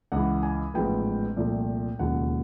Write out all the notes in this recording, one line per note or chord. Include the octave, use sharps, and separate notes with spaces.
C#2 C#3 E3 F#5
G#5
A1 G#2 F3 G#3 B3 G5
C2 A#2 F3 A3
E1 D#2 C#3 F3 F#5